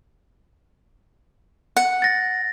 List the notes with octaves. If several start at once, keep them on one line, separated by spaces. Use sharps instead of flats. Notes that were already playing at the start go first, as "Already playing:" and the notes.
F#5
A6 A#6